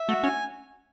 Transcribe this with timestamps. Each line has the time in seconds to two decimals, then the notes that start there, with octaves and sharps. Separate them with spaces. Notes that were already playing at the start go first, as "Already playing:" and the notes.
Already playing: E5
0.09 A3 F#4
0.23 C#4 G#5